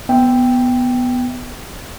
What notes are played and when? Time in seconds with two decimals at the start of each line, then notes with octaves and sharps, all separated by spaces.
0.09 B3 E5 G5